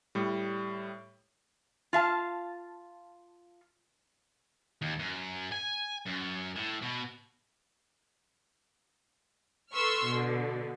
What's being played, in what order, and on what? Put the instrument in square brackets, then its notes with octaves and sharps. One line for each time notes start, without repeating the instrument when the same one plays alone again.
[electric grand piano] A2 G3
[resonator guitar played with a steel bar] F4 F5 A5
[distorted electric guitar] D#2
F#2
G#5
F#2
A2
B2
[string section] A4 B4 C6 C#6 E6 F6
B2 D3